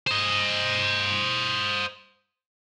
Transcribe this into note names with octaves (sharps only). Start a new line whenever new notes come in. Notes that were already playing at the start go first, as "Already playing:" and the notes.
C5 D#5